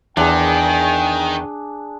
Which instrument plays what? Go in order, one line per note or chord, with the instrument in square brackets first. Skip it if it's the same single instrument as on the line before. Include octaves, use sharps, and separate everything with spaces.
[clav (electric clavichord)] E2 E3 [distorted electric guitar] D#3 [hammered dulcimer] D4 G#4 [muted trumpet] G5